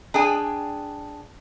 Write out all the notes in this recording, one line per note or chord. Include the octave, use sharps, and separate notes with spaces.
D4 G#4 G5 G#5